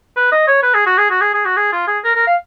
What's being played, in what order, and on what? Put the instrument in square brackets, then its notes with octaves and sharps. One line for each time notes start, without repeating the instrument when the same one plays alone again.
[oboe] B4
D#5
C#5
B4
G#4
F#4
G#4
F#4
G#4
G#4
F#4
G#4
F4
G#4
A#4
A#4
F5